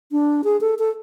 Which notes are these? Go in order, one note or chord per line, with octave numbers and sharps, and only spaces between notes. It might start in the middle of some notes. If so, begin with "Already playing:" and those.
D4
G#4
A4
A4